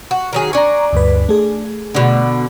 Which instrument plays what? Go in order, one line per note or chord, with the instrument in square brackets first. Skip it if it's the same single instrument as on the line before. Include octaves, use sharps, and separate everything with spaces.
[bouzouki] F#4
D#3 F#3 G#4
[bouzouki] D4 G#5 [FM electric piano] A#5 C#6
[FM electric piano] D2 G2 B4
A3 G#4
[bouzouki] B2 D3